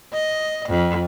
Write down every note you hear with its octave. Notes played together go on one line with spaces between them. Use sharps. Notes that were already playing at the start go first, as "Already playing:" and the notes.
D#5
F2